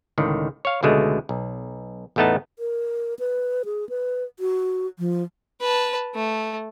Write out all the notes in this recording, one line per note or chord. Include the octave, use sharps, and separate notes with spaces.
C#2 A2 D3 D#3
C#5 F5
C#2 B2 D3 G#3 A3
B1
A1 E2 A3 B3 D#4 A5
A#4
B4
G#4
B4
F#4
F3
B4 A5
A3